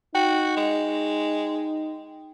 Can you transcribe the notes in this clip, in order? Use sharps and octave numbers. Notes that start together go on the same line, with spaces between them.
D#4 F#4 G5
G#3